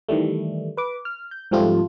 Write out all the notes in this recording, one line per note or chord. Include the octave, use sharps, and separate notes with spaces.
D#3 E3 G3 A3
B4 D6
F6
G6
G#2 F3 G3 A3 C4 F4